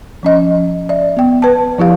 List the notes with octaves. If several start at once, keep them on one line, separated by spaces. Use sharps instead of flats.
F3 C#4 D#5
D5 E5
B3 G5
B4 A5
F3 E4 G4 F5